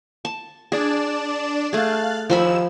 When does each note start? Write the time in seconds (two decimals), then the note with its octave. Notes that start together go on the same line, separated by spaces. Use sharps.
0.25 A5
0.72 D4 G#4 D5 E7
1.73 A3 G#4 F5 F#6 A6
2.30 D#2 F3 G#5 B5 E6 E7